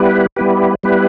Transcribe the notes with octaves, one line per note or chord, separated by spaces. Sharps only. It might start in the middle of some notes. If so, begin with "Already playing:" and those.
Already playing: G3 B3 E4 G4 B4
G3 B3 E4 G4 B4
G3 B3 E4 G4 B4